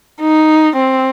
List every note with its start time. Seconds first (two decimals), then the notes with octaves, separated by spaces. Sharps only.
0.21 D#4
0.76 C4